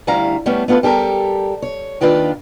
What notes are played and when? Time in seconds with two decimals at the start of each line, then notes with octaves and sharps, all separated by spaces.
0.07 D2 G3 C#4 E4 F5 A#5
0.46 G3 A3 B3 C#4
0.68 A3 B3 F4 A4 B4
0.83 G3 G4 A4 A#4
1.62 C#5
2.01 D#2 D#3 D4 F4 B4 F5